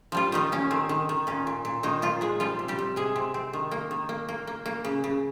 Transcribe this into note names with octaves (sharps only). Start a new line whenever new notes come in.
F3 G3 F4
D#3 G3 D#4
A#3 C#4
D#3 C4
D#3
D#3
A#2 C#4
A#2
A#2
D#3 A#3 D#4
A#2 F3 F4
A#2 G#3 G#4
F3 G3 F4
C3
G3 G4
C3
C3 G#3 G#4
C3
C4
D#3
A#3
D#3
A#3
A#3
A#3
A#3
C#3
C#3